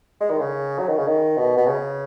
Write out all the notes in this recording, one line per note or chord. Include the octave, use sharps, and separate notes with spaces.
G#3
D#3
C#3
F#3
D#3
C#3
D#3
B2
B2
C#3